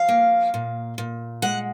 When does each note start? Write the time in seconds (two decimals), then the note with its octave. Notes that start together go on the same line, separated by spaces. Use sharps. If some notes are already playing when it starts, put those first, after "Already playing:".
Already playing: F3 F5
0.09 A#3
0.54 A#2
0.98 A#2
1.42 G#3 F#5